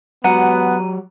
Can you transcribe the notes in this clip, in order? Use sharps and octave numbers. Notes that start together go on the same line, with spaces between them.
F#3 B3 F#4 G4 F#5 A#5 D#7